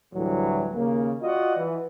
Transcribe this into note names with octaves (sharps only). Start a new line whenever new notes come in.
D2 A2 E3 F#3 G3
D#2 C#3 A#3
F4 F#4 D5 D#5 F#5
E3